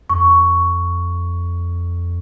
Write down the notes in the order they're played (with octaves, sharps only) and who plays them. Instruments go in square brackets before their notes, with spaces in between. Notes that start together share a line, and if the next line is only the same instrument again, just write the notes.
[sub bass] F2 [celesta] C#6